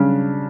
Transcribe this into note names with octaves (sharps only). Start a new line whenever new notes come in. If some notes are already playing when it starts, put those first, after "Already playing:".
Already playing: C#3 F#3 G3 D4